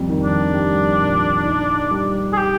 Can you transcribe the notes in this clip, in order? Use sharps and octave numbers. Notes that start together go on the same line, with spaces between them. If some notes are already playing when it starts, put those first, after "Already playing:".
Already playing: F2 G3
D#3
D4
G3
A#2
D#4
G3
G#4
G4